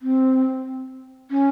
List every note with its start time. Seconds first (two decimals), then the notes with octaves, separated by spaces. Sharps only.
0.02 C4
1.31 C#4